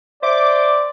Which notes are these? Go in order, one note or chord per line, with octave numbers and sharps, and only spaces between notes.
C5 D5 E5 D6 D7